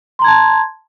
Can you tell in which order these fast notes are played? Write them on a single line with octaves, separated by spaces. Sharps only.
C6 A#5 G#6 A5